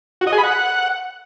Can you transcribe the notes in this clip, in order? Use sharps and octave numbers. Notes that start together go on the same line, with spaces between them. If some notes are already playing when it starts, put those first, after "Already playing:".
F#4
D#5
G#4
B5
F#5